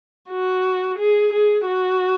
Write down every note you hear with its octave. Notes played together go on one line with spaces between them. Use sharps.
F#4
G#4
G#4
F#4